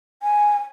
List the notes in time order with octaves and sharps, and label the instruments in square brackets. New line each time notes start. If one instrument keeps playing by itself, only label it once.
[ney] G#5